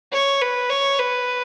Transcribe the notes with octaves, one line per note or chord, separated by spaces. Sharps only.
C#5
B4
C#5
B4